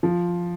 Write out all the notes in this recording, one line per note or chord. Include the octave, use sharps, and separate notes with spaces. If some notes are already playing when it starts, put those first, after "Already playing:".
F3